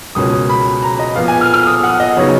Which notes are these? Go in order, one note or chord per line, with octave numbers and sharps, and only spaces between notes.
C#2 B2 A#3 C#4 D#6
B5
A#5
D#5
A#2 F3 B3 F5
G#5
F6
F6
D#6
F#5
D#5
C#3 F#3 B3 D#4 C#5